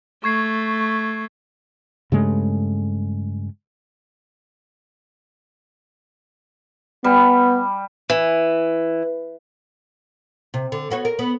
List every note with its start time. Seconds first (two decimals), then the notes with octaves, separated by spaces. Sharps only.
0.24 A3 C#6 G#6 C7
2.12 G2 C#3 G#3 A3
7.04 G3 B3
8.10 E3
10.54 C3
10.72 D3
10.90 B3 F#4 C#5
11.05 A#4
11.19 B3